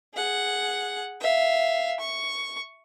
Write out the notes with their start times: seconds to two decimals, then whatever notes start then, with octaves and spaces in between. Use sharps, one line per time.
0.14 G#4 F#5
1.21 E5 F5
2.00 C#6